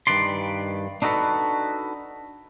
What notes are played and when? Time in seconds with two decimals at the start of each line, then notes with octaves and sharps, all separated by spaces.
0.07 G2 D#3 B4 D5 C6
1.02 D4 D#4 F#4 A4 B4